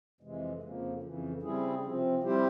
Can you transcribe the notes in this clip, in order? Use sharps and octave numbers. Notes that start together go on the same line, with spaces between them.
F2 C3 E3 G#3
F2 C#3 F3 A#3
F2 C#3 E3
C#3 G3 C4 E4 G#4
C3 F3 C4
G3 C4 E4 G4 C5